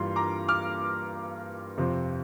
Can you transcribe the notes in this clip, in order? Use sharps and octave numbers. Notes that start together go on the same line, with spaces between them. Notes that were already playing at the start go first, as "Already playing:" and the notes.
Already playing: G2 E3 G3 A#3 F4 C6
A#5 D6
D6 F6
F2 C3 F3 C4